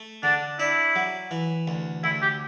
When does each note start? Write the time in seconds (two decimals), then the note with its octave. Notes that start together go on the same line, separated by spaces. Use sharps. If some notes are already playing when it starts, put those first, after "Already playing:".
Already playing: A3
0.23 D3 D4
0.60 D4 E4
0.96 F#3
1.31 E3
1.68 D2
2.04 D2 E4
2.22 G4